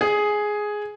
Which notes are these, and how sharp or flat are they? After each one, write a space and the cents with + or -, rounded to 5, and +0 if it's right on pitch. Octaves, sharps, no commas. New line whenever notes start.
G#4 +5